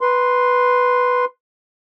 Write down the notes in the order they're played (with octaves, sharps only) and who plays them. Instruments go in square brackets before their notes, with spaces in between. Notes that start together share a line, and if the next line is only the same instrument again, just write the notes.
[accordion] B4 C6